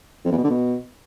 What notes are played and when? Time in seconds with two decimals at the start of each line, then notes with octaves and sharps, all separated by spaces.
0.25 F2
0.31 E2
0.37 B2
0.44 D3
0.50 B2